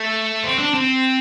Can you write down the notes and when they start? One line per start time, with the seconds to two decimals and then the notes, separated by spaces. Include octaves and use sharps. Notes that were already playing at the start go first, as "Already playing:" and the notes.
Already playing: A3
0.43 C4
0.59 D4
0.74 C4